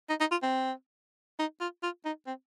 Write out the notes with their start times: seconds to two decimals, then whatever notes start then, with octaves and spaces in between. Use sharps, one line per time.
0.09 D#4
0.20 D#4
0.31 F4
0.42 C4
1.39 D#4
1.60 F4
1.83 F4
2.05 D#4
2.26 C4